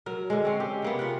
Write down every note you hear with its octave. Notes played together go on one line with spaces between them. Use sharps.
F#3 A#4
D3 G#3
C4 C#4
G4
C3 A#3 B3
F4 A#4 F#5